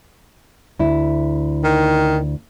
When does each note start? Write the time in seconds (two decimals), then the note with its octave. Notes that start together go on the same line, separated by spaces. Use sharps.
0.79 D2 E4
1.64 D#3